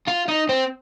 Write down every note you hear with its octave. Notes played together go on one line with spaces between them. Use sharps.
F4
D#4
C4